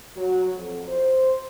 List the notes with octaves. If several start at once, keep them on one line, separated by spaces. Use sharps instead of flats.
F#3
F2
C5